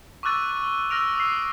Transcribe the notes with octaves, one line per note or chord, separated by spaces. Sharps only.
C#6 D6 E6 F#6 A6 D#7
G7
E6 F6 A#6 D7 F7
D#6 E6 C7